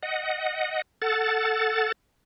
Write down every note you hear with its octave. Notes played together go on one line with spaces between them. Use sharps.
D#5 F#5
A4 F#5 A6